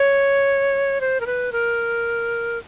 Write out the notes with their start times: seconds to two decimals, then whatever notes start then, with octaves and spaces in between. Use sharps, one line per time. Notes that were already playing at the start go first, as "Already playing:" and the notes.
Already playing: C#5
1.01 C5
1.20 A#4
1.26 B4
1.52 A#4